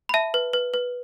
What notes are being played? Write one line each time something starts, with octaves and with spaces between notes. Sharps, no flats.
B5
E5 A5
B4
B4
B4